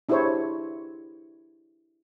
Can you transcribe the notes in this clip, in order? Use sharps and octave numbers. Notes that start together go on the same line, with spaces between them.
D4 E4 G4 G#4 C5 C#5